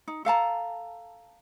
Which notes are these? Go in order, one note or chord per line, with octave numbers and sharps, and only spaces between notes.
D#4
A4 F5 A5 A#5